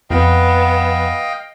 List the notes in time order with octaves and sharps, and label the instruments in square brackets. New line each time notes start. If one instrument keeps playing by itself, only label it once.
[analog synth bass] F2 [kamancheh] B3 [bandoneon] D#5 F5 G5